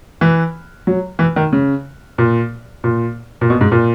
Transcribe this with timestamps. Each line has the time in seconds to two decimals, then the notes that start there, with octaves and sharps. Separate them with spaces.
0.21 E3
0.87 F#3
1.19 E3
1.36 D#3
1.52 C#3
2.18 A#2
2.84 A#2
3.41 A#2
3.50 B2
3.61 G#2
3.72 A#2